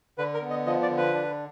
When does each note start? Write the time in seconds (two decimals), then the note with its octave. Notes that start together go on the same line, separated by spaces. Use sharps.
0.18 D3 B4
0.34 A#4
0.42 B3
0.50 D#5
0.66 F3 D#5
0.82 D5
0.89 D3
0.97 B4
1.14 D4